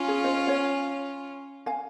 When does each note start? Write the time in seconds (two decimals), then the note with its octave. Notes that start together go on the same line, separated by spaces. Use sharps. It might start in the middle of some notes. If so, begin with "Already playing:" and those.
Already playing: C#4 F4
0.08 G#4
0.24 C5 D#5
0.47 C#5 F5
1.66 F5 G#5